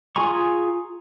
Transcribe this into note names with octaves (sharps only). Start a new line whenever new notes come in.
F4 G#4 G#5 A#5 C#6